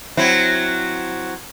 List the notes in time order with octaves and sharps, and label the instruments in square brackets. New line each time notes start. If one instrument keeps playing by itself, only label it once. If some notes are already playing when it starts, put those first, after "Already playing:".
[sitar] F#3 C4 E4